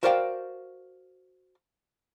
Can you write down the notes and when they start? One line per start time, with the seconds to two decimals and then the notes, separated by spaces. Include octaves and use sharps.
0.03 F#4 A#4 C5 D5 F5 G5